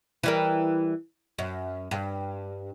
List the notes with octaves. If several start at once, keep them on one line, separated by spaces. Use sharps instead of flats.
E3 G3 A#4
F#2
G2